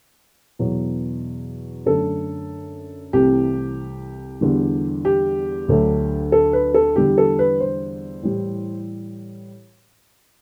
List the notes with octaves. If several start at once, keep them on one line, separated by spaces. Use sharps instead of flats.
E2 B2 F#3
F#2 D3 A3 A4
C2 C3 E3 A3 G4
E2 D3 G3
G4
D2 D3 F#3 A3
A4
B4
A4
E2 D3 G3 G4
A4
B4
C5
A2 E3 G3